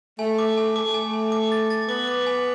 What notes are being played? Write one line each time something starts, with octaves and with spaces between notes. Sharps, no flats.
A3 G#5
D6
G#5
A3 D6
G#5
G#5
D6
A6
A6
B3 D6
D6
G#5